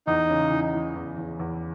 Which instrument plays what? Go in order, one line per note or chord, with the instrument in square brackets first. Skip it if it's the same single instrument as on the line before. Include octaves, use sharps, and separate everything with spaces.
[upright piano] E2 [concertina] D#4
[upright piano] C#3
E3
E3
E2
E2
E2